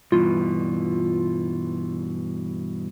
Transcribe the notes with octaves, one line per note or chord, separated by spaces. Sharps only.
G2 B2 E3 F4